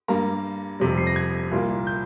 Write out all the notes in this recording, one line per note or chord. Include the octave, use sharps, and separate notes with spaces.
G2 G3 A#3 A#5
F1 F2 C3 G3
C7
A#6
G#6
C2 A#2 G3 A#3
G6